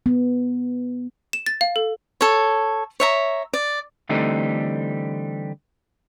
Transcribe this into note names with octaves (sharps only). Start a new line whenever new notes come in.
B3
E7
A6
F5
A4
A4 C#5
C#5 E5 A#5
D5
D3 E3 G3 A3 C4 D#4